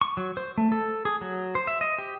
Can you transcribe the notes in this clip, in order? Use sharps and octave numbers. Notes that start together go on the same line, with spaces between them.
C#6
F#3
C5
A3
A4
G#4
F#3
C5
E5
D#5
G4